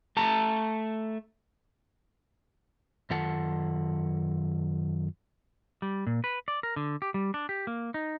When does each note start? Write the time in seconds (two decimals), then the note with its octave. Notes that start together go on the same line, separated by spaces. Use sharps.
0.17 A3 A5 A#5
3.10 F#2 D#3 F4 A4 F#5 A5
5.82 G3
6.07 A#2
6.24 B4
6.48 D5
6.63 A#4
6.76 D3
7.02 G4
7.14 G3
7.34 D4
7.49 G4
7.67 A#3
7.94 D#4